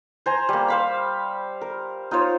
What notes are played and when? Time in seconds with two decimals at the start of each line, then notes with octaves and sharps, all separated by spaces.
0.26 C5 G#5 A#5
0.49 G3 A#3
0.68 C5 F5 B5
1.61 A#4
2.11 D#4 F4 C5 C#5